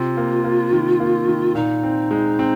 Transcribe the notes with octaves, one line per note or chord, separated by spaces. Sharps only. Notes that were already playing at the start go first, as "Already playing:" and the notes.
Already playing: C3 F4
A#3
A#3
D#3
A#3
D#3
A#2 D#4
C4
G#3
C4